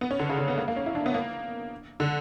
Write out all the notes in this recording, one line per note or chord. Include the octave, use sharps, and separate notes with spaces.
B3
C#4
D3
C#3
D3
B3
A#3
A#3
C#4
E4
D4
B3
A#3
D3